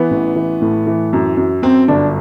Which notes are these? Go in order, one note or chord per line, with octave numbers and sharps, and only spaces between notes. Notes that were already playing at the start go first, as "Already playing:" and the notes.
Already playing: E3 B3
A1
E3
A2
E3
F#2
F#2
F#2 C4
G1 D4